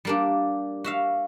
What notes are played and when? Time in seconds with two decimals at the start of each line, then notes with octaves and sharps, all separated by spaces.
0.05 G3 A#3 D4
0.84 F#4 E5 F5